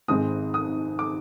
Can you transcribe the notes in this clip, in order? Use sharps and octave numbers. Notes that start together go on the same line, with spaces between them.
G#1 G#2 D#3 G#3 C4 D#6
D#6
D6